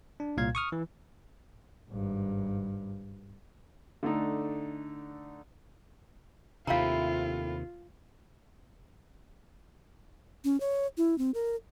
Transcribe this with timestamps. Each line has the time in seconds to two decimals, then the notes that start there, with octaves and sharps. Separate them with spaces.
0.20 D4
0.37 C2 A#2 F5 G#6
0.55 C#6 D#6 F6
0.72 E3
1.90 G#1 G2
4.03 D3 A3 D4 D#4
6.67 D#2 C3 A3 C4 E4 F4 F5 A#5
10.44 C#4
10.60 C#5
10.97 E4
11.18 C4
11.34 A#4